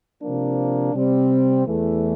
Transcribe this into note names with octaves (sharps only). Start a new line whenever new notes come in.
C3 F3 A#3 D4
C3 G3 C4
E2 E3 A3